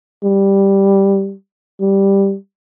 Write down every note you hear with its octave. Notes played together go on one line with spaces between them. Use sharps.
G3
G3